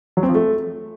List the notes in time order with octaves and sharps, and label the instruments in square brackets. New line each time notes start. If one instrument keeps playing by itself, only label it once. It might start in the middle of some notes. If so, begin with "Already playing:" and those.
[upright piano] F#3
C4
F3
A3